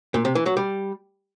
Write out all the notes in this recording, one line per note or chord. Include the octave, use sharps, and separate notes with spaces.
A#2
C3
E3
F#3
G3